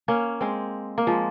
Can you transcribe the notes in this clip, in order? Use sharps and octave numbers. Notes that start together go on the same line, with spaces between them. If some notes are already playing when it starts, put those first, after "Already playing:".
A#3 C#4
G#3 C4
A#3
F3 G#3